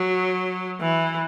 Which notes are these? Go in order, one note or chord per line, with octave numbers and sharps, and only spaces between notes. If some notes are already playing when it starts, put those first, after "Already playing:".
Already playing: F#3
E3